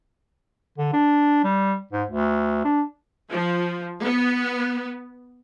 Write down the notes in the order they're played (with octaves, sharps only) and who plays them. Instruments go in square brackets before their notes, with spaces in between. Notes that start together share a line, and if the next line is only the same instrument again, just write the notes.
[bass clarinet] D3
D4
G3
G#2
D2
D4
[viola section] F3
B3